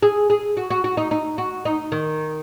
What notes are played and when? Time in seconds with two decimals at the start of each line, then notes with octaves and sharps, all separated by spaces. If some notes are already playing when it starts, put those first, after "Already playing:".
0.02 G#4
0.30 G#4
0.57 F#4
0.70 F#4
0.84 F#4
0.97 D#4
1.11 D#4
1.38 F#4
1.65 D#4
1.92 D#3